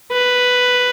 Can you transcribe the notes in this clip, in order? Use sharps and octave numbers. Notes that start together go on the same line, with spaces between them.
B4